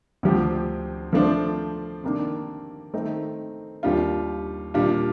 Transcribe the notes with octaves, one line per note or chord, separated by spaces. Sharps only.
D2 C3 F3 C4 G4
F3 A3 D4 F4 C5
C3 D#3 A#3 D4
D#3 A3 C4 D#4
D#2 D#3 G3 D4 F4
A#2 G3 D4 F4